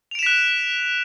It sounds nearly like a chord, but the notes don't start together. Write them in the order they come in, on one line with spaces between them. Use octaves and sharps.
F7 D7 E7 B6 F#6